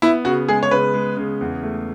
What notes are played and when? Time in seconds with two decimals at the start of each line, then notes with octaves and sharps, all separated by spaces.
0.02 B3 E4
0.25 C#3 F#4
0.48 G#3 G#4
0.63 C#5
0.71 C#3 B4
0.94 G#3
1.17 C#3
1.41 E2
1.63 A3